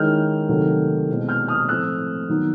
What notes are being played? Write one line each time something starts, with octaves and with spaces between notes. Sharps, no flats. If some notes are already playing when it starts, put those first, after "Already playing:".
Already playing: D#3 G#3 C#4 E4 F6 G6
C3 D#3 F#3 A3
B2 G#3 C4 E4
F6 G6
D#6 F6
A2 F3 A3 C4 E6 F#6
D#3 F#3 B3 D#4